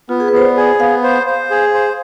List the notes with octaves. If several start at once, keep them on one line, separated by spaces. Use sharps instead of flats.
B3 F4
G#4
B4
B3 C5
D5
G#4
B3 F5
C5
C5
G#4
C5